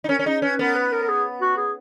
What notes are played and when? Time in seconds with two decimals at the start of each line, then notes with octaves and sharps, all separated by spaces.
0.04 D#4
0.09 C#4 A#4
0.19 C#4
0.26 D#4 G#4
0.42 C#4 B4
0.59 B3 A#4
0.75 B4
0.92 A#4
1.02 A#4
1.09 G#4
1.41 F#4
1.57 G#4